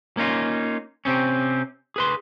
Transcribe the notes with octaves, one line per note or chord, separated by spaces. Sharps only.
A#3 C#4 D#4 F4
C3 C4 C#4
G#4 B4 C6